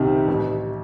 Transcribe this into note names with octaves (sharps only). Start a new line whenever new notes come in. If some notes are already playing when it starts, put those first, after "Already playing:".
Already playing: C2 C3 D#3
A1